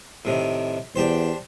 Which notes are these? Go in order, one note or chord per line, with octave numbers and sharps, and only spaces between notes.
A2 C3 D#3
E2 D4 G4 C5